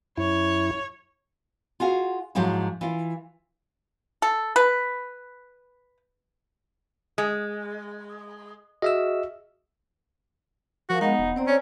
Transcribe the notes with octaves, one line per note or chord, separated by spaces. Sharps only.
F#2 E4 C#5
F4 F#4 G#4 F5
G#2 F3 F#3 G#3 E4
E3 F4
A4
B4
G#3
F#4 G#4 D#5 E5 E6 F6
F3 F#4 A#4 F5
G#3 B3 D#4 D#5 F#5
E1
C4 C5 D5 A#5
C#4 C#5